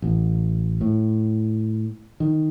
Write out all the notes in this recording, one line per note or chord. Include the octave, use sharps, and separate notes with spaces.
A1
A2
D#3